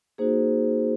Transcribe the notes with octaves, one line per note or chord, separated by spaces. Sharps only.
A#3 D#4 F#4 G#4 C5